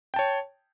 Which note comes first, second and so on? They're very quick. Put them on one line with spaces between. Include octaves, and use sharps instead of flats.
G5 A5 C#5